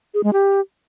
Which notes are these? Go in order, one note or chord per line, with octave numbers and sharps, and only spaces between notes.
G#4
G#3
G4